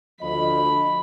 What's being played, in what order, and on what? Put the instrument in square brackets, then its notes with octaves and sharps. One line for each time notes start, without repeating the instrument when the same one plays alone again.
[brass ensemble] D2 F3 D#5 [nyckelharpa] B5